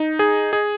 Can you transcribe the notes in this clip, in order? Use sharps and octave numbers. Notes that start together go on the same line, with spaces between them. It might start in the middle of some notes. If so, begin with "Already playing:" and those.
Already playing: D#4
G#4
G#4